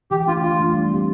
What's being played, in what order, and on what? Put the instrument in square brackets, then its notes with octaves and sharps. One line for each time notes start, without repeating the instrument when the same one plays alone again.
[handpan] E3 [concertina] G4
[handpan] A3 D4 [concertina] F4
[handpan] E3 [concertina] F4
[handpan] A3 D4
G3
C4 G4